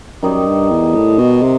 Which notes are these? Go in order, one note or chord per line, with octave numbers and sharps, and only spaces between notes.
F#2 D#3 G3 D#4
G2
E2
A2
B2
C3